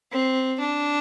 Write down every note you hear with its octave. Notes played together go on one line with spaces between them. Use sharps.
C4
D4